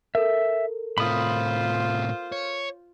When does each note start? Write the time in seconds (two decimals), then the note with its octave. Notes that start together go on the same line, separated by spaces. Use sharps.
0.15 A4 A#4 E5
0.98 A2 C3 F4 C5 B5 D#6
2.32 C#5